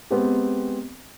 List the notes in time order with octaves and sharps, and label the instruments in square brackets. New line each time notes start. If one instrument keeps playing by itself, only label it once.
[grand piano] G#3 B3 C4 G4